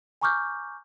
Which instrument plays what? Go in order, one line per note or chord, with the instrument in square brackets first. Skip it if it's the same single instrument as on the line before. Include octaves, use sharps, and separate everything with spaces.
[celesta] G#5 A#5 C#6 D6 F6 G6